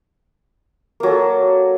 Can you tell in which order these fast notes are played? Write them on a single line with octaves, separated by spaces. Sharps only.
A#3 F#3 A4